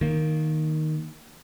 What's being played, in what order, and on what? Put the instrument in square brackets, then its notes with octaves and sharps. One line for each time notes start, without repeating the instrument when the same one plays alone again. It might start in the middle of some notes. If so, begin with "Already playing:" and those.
[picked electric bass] D#3 A#3